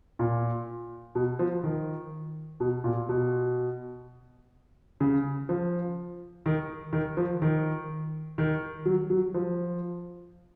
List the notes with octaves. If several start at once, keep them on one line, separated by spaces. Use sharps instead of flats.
A#2
B2
F3
D#3
B2
A#2
B2
C#3
F3
D#3
D#3
F3
D#3
D#3
F#3
F#3
F3